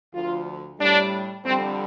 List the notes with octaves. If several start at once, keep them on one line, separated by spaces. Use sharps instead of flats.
D2 D3 F3 F4
A2 G3 D4
F2 D3 G3 C4